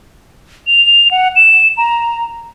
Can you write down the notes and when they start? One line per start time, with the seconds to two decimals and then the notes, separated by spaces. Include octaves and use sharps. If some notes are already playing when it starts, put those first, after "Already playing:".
0.67 F7
1.11 F#5
1.36 E7
1.77 A#5